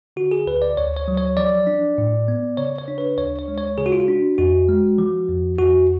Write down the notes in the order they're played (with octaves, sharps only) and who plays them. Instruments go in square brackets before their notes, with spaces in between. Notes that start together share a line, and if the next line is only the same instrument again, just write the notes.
[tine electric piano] D3 F#4
G#4
D2 B4
D5
D2 C#5
C#5
F#3
C#5
F3 D5
D4
A2
B3
C#3 C#5
C#5
D4
B4
D2 C#5
C#5
G#3
C#5
C#3 G#4
F#4
F4
F#4
D4
F2 F#4
G#3
F3
F2
F2 F#4